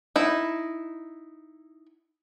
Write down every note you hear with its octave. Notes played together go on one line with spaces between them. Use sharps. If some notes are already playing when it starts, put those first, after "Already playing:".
D#4 E4